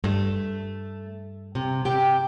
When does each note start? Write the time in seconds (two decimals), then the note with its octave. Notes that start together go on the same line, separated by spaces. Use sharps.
0.04 G2 A3
1.55 C3
1.85 C3 G4 G5